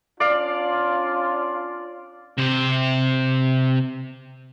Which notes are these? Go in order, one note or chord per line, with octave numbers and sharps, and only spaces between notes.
C#4 D4 F4 D5 F5
C3 C5